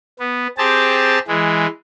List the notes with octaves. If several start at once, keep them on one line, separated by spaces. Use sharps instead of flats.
B3
C4 G4 G#4 A5
E3 G#3